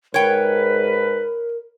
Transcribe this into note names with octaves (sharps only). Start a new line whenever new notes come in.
G#2 A#4 B4 C#5 G5